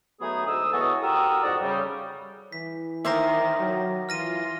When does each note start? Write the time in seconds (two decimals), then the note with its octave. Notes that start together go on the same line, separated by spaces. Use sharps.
0.20 F#3 A3 B3 D#4 G#4
0.46 D2 G#3 D#4 G#4 D#6 E6
0.73 E3 B3 F#4 G#4 A4 C#5
1.02 F#4 G4 A4 A#4 D#6 E6
1.44 F2 G#2 D#4 F#4 D5 A#5
1.62 C#3 G3
2.52 E3 B6
3.05 D#3 A#4 C5 E5 D6 A#6
3.60 F#3
4.09 E3 F4 F6 A#6 D#7